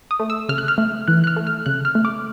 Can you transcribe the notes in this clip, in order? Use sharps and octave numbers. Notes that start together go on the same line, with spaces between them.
D#6
A3
E6
C#3 F6
F#6
F6
A3
E3 F#6
F#6
F6
A3
F6
C#3 F#6
F6
A3
D6